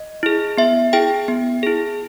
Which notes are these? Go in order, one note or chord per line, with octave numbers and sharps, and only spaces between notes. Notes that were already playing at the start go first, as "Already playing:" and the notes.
Already playing: D#5
E4 G#4
B3 E5
E4 G#4 G5
B3
E4 G#4